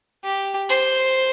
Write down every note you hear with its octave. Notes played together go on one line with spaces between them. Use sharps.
G4
C5